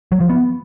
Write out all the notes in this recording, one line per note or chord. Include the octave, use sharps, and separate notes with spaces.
F#3
F3
B3